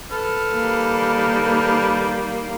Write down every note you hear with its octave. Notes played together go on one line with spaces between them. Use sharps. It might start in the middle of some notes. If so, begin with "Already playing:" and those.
A4 B4 F6
D#3 G3 A#3